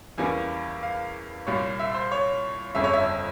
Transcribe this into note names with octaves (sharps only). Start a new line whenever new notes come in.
E2 E3 G3 A#3 C#4 G#5
F5
C2 A#2 G3 C#5
E5
C5
C#5
G1 F2 C#3 E5
C#5
E5